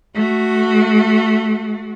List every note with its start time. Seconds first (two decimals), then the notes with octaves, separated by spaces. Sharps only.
0.14 A3 F#4